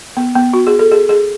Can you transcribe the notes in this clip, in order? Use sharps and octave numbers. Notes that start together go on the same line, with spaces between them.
B3
B3
F#4
G#4
A4
G#4
G#4